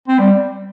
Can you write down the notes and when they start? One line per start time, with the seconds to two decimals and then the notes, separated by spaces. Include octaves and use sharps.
0.08 C4
0.19 G3